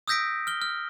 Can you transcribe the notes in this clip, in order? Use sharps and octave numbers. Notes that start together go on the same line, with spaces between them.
D#6 E6 G6 A#6 B6 D7
F6 G7
F6